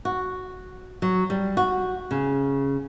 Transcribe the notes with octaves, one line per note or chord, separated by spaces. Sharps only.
F#4
F#3
G3
F#4
C#3